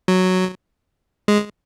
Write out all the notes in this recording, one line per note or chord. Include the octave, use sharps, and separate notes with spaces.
F#3
G#3